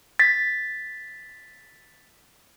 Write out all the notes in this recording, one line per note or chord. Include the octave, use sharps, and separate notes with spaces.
A6 B6